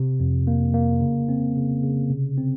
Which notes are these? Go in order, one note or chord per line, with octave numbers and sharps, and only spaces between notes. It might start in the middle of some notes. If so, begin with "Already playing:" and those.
Already playing: C3
F2
A#3
A#3
C#3
C4
C#3
C#3
C3
C4